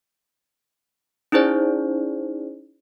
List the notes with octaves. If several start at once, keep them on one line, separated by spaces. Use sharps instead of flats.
C#4 D#4 E4 G#4 C5 D5